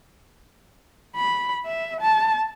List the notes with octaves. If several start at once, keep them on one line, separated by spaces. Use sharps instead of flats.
B5
E5
A5